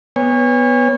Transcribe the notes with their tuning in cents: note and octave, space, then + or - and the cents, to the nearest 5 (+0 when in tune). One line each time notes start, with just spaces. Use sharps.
B3 +0 C#5 +0 G#5 -35